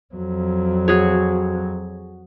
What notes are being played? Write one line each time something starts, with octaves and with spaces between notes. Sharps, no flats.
F2 F#3
F#4 G#4 C#5